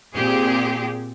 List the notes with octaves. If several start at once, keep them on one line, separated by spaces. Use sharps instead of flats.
A#2 C4 G4 G#4